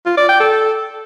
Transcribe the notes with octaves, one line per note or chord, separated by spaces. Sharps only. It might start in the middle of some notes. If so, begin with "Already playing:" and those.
F4
D5
G5
A4